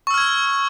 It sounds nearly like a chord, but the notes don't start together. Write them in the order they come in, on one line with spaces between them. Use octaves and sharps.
C#6 E6 F6 G#6